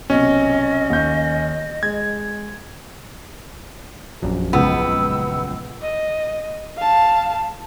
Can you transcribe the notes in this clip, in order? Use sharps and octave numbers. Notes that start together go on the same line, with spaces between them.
B1 C3 C#4 D#5
D#2 G6
G#3 G#6
A#1 F#2
C#2 B3 E6
D#5
F5 A5